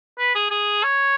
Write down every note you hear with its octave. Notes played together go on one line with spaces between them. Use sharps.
B4
G#4
G#4
C#5